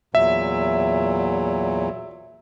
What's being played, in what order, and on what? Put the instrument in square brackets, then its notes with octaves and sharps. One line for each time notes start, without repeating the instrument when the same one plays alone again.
[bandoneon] E2 A#2 F#3 [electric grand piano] E5